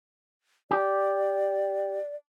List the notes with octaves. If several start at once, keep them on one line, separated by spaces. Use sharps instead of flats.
G4 D5